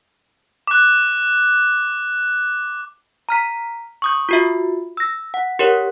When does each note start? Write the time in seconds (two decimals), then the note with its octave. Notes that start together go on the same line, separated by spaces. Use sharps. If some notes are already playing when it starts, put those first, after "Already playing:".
0.67 D6 F#6
3.29 A#5 F6 B6
4.02 C#6 D#6 G6
4.29 F4 F#4 E5
4.97 E6 A#6
5.34 F#5
5.59 G4 A#4 C#5 F#5